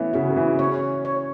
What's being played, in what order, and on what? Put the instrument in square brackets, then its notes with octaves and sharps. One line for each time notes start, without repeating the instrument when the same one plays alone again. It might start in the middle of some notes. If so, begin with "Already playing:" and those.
Already playing: [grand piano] E3 B3 C#4 [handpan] A3
[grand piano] C#3 [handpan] F#4
[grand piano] C#3
E3
[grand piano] C#4 [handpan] C#5
[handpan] C#5